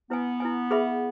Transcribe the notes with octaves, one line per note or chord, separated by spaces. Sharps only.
B3 E4 B4 G#5
E4 B4 G#5
G#4 B4 E5 B5